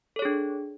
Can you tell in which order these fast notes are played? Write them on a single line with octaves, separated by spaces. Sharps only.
A4 C#5 G#4 D4